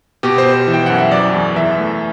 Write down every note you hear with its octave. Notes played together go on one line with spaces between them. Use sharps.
B2 G4
C5
B2
C5
E3
G5
F#2 F#5
E5
F#3 D5
E2
E3 E5
A3